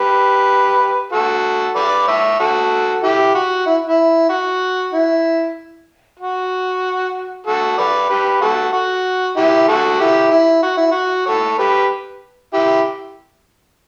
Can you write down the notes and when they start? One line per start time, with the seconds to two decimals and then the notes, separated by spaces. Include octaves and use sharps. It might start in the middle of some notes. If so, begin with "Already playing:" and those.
Already playing: G4 B4
1.12 F#4 A4
1.76 B4 D5
2.07 C#5 E5
2.40 F#4 A4
3.03 E4 G4
3.35 F#4
3.67 E4
3.88 E4
4.29 F#4
4.94 E4
6.20 F#4
7.47 F#4 A4
7.78 B4 D5
8.10 G4 B4
8.41 F#4 A4
8.73 F#4
9.36 E4 G4
9.68 F#4 A4
9.99 E4 G4
10.31 E4
10.63 F#4
10.77 E4
10.91 F#4
11.26 A4 C#5
11.58 G4 B4
12.54 E4 G4